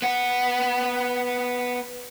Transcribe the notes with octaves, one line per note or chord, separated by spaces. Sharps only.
B3 F#5